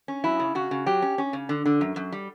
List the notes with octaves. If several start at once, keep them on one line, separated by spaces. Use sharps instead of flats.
C#4
F#3 E4
C#3
C#3 F#4
C#3
F#3 G4
C#4
C#4
C#3
D3
D3
F#2
F#2
G3